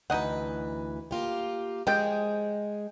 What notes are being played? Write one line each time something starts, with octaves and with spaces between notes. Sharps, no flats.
D2 E3 D#4 B4 D#5 F#5
A#3 F4 G4
F3 G#3 G4 G#4 G5